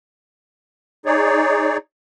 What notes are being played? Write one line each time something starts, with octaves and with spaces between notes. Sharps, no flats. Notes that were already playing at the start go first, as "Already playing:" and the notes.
D#4 G#4 C#5 D5